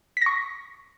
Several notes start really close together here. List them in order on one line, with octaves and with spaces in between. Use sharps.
B6 A#6 C#6